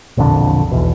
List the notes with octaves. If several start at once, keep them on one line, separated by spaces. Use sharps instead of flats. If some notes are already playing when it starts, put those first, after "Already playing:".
E1 A#1 F2 D3
B1 E2